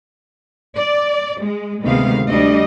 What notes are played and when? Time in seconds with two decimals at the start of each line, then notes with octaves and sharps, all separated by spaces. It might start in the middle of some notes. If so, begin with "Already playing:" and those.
0.78 D5
1.42 G#3
1.84 D2 C3 D#3 G#3 B3 F5
2.27 D2 G3 A3 D4 D#5